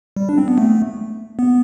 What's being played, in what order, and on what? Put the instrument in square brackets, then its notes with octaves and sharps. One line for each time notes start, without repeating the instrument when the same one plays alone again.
[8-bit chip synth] G3
D4
C4
B3
A3
B3